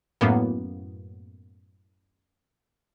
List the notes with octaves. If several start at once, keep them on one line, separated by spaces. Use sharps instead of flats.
F#2 A2 A#3 B3